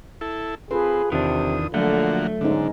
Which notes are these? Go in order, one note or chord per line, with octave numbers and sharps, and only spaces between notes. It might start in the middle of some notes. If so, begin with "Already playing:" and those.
E4 A4
C4 F4 G#4 A4 B4
E2 C3 D#3 D4 D#6
D3 F3 F#3 A3 A#3 F#4
G#2 D3 B3 C#4 D#4